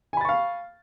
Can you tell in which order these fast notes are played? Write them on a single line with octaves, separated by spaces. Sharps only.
G#5 B5 A6 C#6 F5